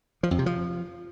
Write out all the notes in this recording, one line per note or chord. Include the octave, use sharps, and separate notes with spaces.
F3
F2
C3
F3